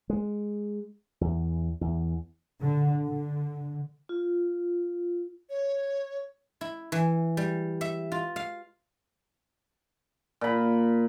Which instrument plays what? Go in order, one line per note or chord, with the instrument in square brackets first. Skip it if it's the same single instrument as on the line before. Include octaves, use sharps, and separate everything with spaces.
[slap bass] G#3
E2
E2
[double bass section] D3
D3
[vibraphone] F4
[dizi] C#5
[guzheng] E4
E3
G3
E5
F4
F5
[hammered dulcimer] A#2 B5